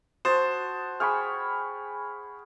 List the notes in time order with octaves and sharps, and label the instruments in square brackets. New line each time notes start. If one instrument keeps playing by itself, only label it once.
[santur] F#4 A5 [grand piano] C5 [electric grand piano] D#6 A6
[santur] G#4 G5 G#5 [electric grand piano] B5 C#6 F6